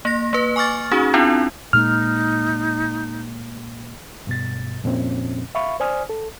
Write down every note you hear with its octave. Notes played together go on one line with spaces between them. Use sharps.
A#3 A#6
A#3 B4
G#5 C#6 D6 F6 A6
C#4 D#4 F#4 G#4
C4 D4 E4 F4
A#2 G#3 A#3 D#4 F6
G2 B2 A6
F2 A#2 F3 C4 C#4
E5 F5 B5 C#6
C5 D5 G#5 D#6 F6
A4